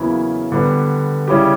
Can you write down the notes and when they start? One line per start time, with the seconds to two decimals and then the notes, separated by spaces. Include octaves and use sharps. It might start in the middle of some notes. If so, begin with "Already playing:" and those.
Already playing: E2 C#3 F#3 A#3 E4
0.52 D3 G3 B3
1.28 C#3 G3 C#4 E4 G4